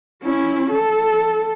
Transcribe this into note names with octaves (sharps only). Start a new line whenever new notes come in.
C#4 E4
A4